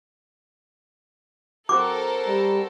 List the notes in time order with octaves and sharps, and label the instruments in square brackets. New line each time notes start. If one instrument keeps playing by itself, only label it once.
[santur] C4 F#4 C6 [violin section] A4 A#4 C5 [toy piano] D6
[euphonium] G3